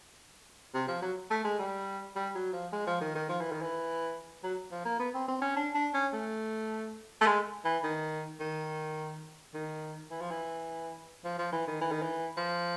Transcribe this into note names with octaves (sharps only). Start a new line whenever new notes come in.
C3
F3
F#3
A3
G#3
G3
G3
F#3
F3
G#3
F3
D#3
D#3
F3
E3
D#3
E3
F#3
F3
A#3
B3
C4
C4
C#4
D4
D4
C#4
A3
A3
G#3
E3
D#3
D#3
D#3
E3
F3
E3
F3
F3
E3
D#3
E3
D#3
E3
F3